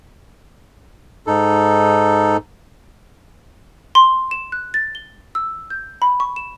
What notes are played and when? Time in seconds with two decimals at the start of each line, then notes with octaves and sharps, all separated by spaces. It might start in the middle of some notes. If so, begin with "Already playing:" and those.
1.27 G#2 D#4 A4
3.95 C6
4.31 E7
4.52 F#6
4.74 A6
4.95 G7
5.35 E6
5.70 G6
6.02 B5
6.20 C#6
6.36 E7